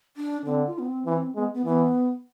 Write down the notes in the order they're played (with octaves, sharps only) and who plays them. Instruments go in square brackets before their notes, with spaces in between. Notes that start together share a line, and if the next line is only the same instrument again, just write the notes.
[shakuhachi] D4
[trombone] D3 [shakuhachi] C4
[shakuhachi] F4
B3
C4
[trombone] E3 [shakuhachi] C4
[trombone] G#3 [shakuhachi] B3
[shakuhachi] B3
[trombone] E3 [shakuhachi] B3